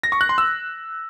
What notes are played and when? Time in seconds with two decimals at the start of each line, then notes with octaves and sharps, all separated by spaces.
0.03 A#6
0.12 C#6
0.21 F#6
0.29 C6
0.38 E6